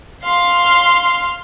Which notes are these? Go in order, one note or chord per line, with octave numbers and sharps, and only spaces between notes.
F5 C6